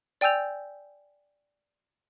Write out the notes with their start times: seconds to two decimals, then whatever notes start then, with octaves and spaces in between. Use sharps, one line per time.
0.21 D5 G5 G#5 E6 G6 F7